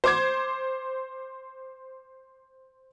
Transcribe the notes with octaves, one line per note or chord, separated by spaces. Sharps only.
C5 D6 G#6